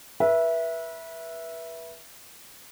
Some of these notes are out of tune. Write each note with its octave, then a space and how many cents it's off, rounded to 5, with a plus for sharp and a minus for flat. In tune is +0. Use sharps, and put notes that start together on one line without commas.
B4 -30 E5 +0